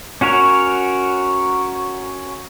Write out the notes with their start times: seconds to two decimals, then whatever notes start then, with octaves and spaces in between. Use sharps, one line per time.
0.21 C#4 F#4 A#4 C#5